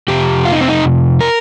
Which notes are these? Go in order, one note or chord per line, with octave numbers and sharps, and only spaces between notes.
F2 C3 G4
F4
D#4
C4
D#4
A#4